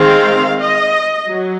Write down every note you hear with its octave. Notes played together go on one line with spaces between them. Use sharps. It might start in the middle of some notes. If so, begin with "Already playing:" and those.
Already playing: D#3 G#3 C4 F5
D#5
F#3